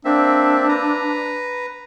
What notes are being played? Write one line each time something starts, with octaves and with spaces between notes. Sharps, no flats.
A#3 C4 D4 E5
B4 A#5